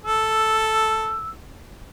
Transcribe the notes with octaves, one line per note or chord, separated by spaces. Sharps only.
A4 E6